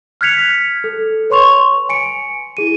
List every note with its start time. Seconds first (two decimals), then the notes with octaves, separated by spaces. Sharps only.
0.21 F6 F#6 G#6 B6 C#7 F7
0.84 A4
1.30 B4 C#5 C6 C#6 F7
1.89 G#5 C#7 D7
2.57 E4 G#4 D#7